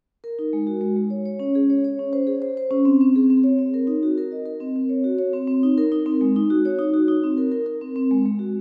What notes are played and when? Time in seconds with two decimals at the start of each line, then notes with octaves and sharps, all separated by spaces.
0.24 A#4
0.39 D#4
0.53 G#3
0.67 F#4
0.81 G#3
0.97 G#3
1.10 C#5
1.25 C#5
1.40 C#4
1.55 G#4
1.70 C#5
1.84 C#5
1.99 C#4
2.13 C5
2.27 G#4
2.42 C5
2.57 C5
2.71 C#4
2.85 C4
3.01 C4
3.16 G#4
3.30 C4
3.44 C#5
3.59 C4
3.74 A#4
3.87 D#4
4.03 F#4
4.18 A#4
4.32 D#5
4.46 A#4
4.60 C4
4.76 C4
4.89 C#5
5.04 F#4
5.19 C#5
5.33 C4
5.48 C4
5.63 D#4
5.78 A#4
5.92 D#4
6.06 C4
6.21 G#3
6.36 D#4
6.50 F#4
6.65 C#5
6.79 D#4
6.94 F#4
7.08 D#4
7.23 C4
7.37 A#4
7.52 A#4
7.66 A#4
7.81 C4
7.96 C4
8.11 G#3
8.26 G#3
8.39 F#4